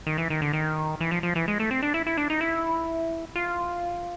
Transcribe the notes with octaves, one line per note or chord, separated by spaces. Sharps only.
D#3
E3
D#3
D3
D#3
E3
F3
F3
E3
G#3
A3
C4
D4
E4
E4
D4
D#4
E4
F4